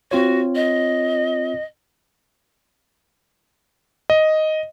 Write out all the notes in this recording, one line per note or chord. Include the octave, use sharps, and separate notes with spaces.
C4 F4 F#4 C#5
D#5
D#5